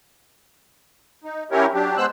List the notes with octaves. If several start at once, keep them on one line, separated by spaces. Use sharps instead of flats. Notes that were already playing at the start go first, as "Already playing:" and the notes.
D#4
F#3 C#4 E4 G4 A#4 C#5
F#3 D4 G4
G#3 B3 C5 E6 F#6